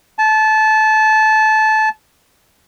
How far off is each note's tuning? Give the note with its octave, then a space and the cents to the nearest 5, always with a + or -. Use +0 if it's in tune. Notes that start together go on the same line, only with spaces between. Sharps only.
A5 -20